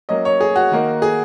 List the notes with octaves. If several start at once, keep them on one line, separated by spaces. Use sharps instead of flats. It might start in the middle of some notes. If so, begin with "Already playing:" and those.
F#3 A#3 C#4 D#5
C#5
G#4
F#4
D#3 A#3 D#4
G#4